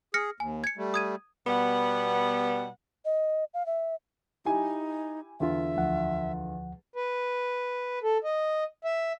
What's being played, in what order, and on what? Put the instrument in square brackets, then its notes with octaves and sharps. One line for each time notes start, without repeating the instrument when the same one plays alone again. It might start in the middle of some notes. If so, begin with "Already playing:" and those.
[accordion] G#4 [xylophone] F6 A#6 C#7
[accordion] D#2 [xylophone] G#5
[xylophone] G#6 C#7
[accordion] G3 A3
[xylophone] D#6 G#6 D#7
[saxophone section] B2 G3 B3 F#5
[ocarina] D#5
F5
E5
[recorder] D#4 [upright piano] E4 G4 G#5
[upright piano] E2 D3 F4 [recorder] E5
[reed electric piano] D2 F3 F#5
[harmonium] B4
A4
D#5
E5